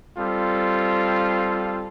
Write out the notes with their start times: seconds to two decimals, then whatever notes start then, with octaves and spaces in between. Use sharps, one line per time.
0.18 G3 C4 F4 A4